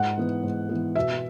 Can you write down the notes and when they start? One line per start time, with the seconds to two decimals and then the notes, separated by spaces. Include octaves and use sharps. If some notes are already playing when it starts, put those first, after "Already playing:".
Already playing: G#2 F#5
0.17 E3 B3
0.43 G#2
0.69 E3 B3
0.95 B2 E5